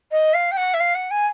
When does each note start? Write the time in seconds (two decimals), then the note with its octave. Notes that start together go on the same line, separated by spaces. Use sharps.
0.11 D#5
0.34 F5
0.52 G5
0.57 F#5
0.74 E5
0.80 F5
0.95 F#5
1.11 G#5